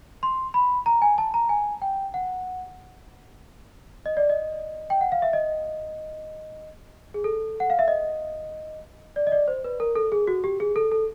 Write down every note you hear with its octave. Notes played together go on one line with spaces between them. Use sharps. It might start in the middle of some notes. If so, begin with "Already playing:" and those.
C6
B5
A#5
G#5
A5
A#5
G#5
G5
F#5
D#5
D5
D#5
G5
F#5
F5
E5
D#5
G#4
A4
F#5
F5
E5
D#5
D5
D#5
D5
C5
B4
A#4
A4
G#4
F#4
G4
G#4
A4
A4